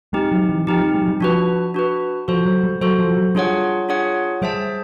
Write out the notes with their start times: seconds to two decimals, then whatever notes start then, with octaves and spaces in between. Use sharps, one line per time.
0.13 G#3 C4 D#4 G4
0.32 F#3
0.49 E3
0.67 F3 C4 D#4 G4
0.80 G3
0.94 G#3
1.02 F#3
1.08 G3
1.21 F3 D4 F#4 B4
1.74 D4 F#4 B4
2.28 F3 F#4 A4 C5
2.46 F#3
2.64 G3
2.81 F#3 F#4 A4 C5
2.99 F3
3.17 F#3
3.35 G3 D4 F4 G#4 C#5 F#5
3.89 D4 F4 G#4 C#5 F#5
4.42 G3 G#4 C5 E5 A5